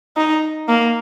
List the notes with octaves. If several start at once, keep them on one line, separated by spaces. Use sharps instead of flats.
D#4
A#3